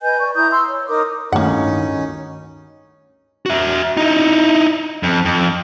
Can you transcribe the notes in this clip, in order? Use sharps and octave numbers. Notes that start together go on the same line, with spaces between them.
B4 D#5 G#5 G6
D5 C#6
E4 A#5 D#6 G6
C6 E6
C#5
D#4 A#4 D6 D#6
A1 D2 G2 D#3 A#3 C#4 D#4 F#5
F#4 E5
D#4 E4
F2
F2